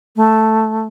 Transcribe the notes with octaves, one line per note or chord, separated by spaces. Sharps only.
A3